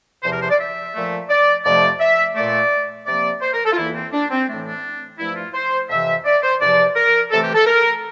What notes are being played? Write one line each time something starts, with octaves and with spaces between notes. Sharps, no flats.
E2 C3 F3 C5
A#4
C5
D5
E5
A#2 F3 A3
D5
F2 C3 F3 A3 D5
E5
A#2 A3 D5
C3 F3 A#3 D5
C5
A#4
A4
F4
E2 E3 A#3 E4
C4
D4
C4
A2 E3 A3 D4
D4
G2 F3 A3 E4
F4
C5
F2 C3 E3 E5
D5
C5
E2 C3 F3 D5
A#4
C3 E3 A3 A4
G4
A4
A#4